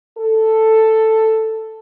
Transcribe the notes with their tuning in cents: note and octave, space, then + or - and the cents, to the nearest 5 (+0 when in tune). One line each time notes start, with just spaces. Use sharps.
A4 +5